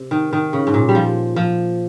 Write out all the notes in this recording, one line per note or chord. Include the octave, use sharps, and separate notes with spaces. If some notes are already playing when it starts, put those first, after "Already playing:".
Already playing: C3
D#3
D#3
C#3
G#2
A#2
G3
F3
F3